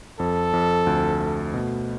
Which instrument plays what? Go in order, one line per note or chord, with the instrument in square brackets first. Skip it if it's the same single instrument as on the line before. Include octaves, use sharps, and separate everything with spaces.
[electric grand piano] F2 [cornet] A4
[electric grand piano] F2
D2
A3
B2